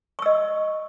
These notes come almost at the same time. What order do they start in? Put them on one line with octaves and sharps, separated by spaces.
C#6 E6 D#5